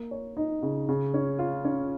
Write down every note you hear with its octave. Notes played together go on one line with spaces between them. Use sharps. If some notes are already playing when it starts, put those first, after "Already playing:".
Already playing: A#3
C#5
D#4
C#3
C#3
C#4
F4
C#4